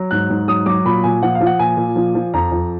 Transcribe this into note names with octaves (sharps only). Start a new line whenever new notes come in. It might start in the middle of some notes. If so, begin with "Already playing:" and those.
Already playing: F#3
G#2 F#6
G#2
F#3 D#6
F#3 D6
A#2 B5
A#2 G#5
F3 F#5
F5
F3
F#5
A#2 G#5
A#2
F3
F3
F2 A#5
F2